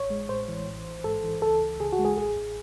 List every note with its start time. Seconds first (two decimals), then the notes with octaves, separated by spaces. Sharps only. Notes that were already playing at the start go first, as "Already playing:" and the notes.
Already playing: A1 C#5
0.10 G#3
0.29 A2 C5
0.48 E3
0.67 A1
0.86 A1
1.04 G#2 A4
1.24 E3
1.42 C#2 A4
1.61 C#2
1.80 C#3 G#4
1.92 F#4
1.99 G#3
2.05 G#4
2.17 A1 G#4
2.36 A1